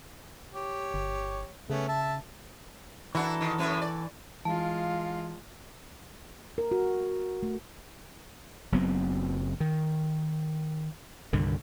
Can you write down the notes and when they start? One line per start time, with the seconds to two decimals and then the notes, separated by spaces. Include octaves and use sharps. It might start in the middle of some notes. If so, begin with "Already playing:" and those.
0.54 G4 C#5
0.94 G1
1.70 C#3 A3 B3 C#4
1.88 E5 A5
3.15 E3 D4 E4 F#4 A4 A#4
3.41 D#3
3.58 F#2 A2 B4
3.81 D5
4.45 E3 G#3 F4 F5 A5
6.58 A#4
6.71 F#4
7.43 A3
8.72 F#1 F#3 B3 C4
9.60 D#3
11.33 C2 G2 D3 D#3